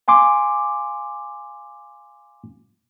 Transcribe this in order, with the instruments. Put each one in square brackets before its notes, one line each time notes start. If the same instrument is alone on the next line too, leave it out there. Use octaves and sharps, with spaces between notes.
[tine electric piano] F5 G#5 C6 D6